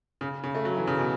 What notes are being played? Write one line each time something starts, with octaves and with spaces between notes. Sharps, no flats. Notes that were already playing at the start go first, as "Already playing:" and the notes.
C#3
C#3
A3
F#3
E3
C#3
B2